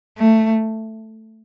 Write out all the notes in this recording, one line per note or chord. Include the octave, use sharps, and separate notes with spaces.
A3